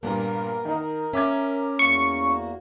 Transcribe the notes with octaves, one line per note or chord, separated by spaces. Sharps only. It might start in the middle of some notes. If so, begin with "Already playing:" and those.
G2 A#2 A#3 B3 A#4
D#3 D#4
C#4 E5 D6 G#6
E2 A#3 F#4 C#6